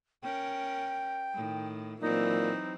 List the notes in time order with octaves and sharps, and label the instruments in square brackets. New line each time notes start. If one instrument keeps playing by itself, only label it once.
[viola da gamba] C#4 A#4 [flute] G5
[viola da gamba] A2 D#3
[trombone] A#2 [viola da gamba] E3 F#3 C4 [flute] D#4